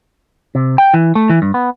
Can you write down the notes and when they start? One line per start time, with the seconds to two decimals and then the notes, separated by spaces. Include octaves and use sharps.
0.55 C3
0.78 G5
0.94 E3
1.15 A3
1.30 E3
1.42 G2
1.54 B3